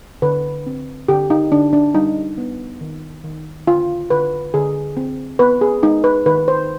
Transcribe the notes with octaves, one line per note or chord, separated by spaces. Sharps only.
D3 B4
C4
D3 G4
D#4
D3 D4
D4
G3 D#4
B3
D#3
D#3
D3 F4
D3 B4
D3 G#4
C4
B3 B4
G#4
G#3 D#4
B4
D#3 B4
C5